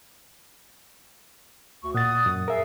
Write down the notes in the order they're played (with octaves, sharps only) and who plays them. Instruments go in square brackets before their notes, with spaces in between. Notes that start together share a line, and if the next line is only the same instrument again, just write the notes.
[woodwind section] D2 C#6
[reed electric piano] A#2 A6 [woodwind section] F#5 D#6
[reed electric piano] F#2
[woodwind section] G#4 F5 [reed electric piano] A#4 E5